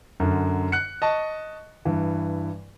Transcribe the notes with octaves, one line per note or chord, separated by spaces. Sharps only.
F#2 D3
F#6 C#7
D#5 A5 C#6
G2 E3